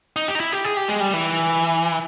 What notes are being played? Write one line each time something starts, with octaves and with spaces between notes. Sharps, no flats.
D#4
G4
D#4
E4
G4
G#4
G4
G#3
G3
E3